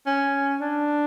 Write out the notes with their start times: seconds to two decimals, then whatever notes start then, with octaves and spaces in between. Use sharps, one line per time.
0.06 C#4
0.61 D4